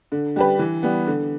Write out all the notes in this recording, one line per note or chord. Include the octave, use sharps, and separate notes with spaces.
D3
G3 D4 G4 B4
E3
G3 B3
D3